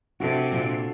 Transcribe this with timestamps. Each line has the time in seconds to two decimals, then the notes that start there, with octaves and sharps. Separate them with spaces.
0.20 C3 D4 F#4 A4
0.52 A#2 D4 F4